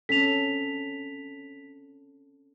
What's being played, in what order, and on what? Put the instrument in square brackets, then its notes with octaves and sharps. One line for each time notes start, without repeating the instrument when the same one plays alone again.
[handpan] C4 C#4 A4 [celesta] B6 F7